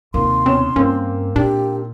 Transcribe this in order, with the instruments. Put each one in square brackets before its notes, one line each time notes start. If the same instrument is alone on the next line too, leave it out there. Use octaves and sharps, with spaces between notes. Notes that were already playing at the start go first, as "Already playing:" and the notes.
[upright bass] D#2 C3 [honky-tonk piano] A#3 [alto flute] C6
[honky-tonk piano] B2 C#4 E7 [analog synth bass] C4
[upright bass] G2 [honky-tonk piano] A#3 C4 [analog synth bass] C#4
[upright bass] A#2 [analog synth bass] D4 [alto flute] G4